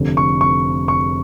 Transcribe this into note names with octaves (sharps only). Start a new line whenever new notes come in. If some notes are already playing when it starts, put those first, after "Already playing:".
Already playing: F1 F2 D3
C#6
C#6
C#6